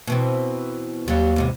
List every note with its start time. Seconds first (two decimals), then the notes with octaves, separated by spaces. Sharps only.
0.07 B2 E3 C4
1.08 D#2 F#3 G3
1.36 E2 G#2 C3